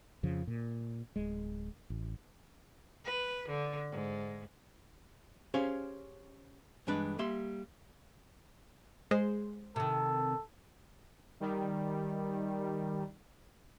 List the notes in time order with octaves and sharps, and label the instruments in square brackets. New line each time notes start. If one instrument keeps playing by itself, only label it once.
[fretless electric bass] F2 C#3 F3
A#2
D1 G#3
A1
[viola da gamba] B4
D3
G#2
[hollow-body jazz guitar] C#4 G4 G#4 C5 C#5 F5
G2 E3 G#3 D4 B4
G3 A#3 G4 E5 C6
[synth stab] G#3 [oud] C5
[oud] C3 D#3 [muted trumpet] A4
[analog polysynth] D#3 G3